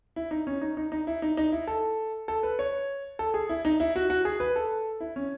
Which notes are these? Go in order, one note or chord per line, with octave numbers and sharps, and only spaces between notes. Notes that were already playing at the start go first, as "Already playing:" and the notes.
E4
D#4
C#4
D#4
D#4
D#4
E4
D#4
D#4
E4
A4
A4
B4
C#5
A4
G#4
E4
D#4
E4
F#4
F#4
G#4
B4
A4
E4
C#4